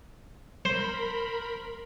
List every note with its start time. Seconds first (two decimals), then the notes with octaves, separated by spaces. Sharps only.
0.65 A#4 C5 B5